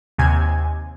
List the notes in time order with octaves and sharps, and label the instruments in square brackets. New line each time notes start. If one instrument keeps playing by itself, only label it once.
[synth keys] D#2 C3 G#5 G#6